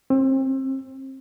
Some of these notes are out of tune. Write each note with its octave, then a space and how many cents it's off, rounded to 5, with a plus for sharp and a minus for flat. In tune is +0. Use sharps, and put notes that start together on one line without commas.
C4 +30